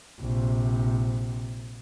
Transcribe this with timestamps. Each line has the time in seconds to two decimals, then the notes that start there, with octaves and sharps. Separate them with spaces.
0.20 A#1 C3